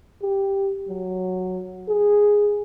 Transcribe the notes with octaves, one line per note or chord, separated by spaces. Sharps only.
G4
F#3
G#4